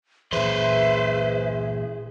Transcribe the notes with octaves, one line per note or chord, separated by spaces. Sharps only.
A#2 E3 G#4 B4 C5 E5